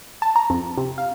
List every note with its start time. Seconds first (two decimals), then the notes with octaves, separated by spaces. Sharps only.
0.22 A5
0.36 A#5
0.50 F2
0.78 C3
0.98 F5